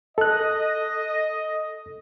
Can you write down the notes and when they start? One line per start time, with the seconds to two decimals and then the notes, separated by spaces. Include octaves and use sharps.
0.18 A4 D#5 F#6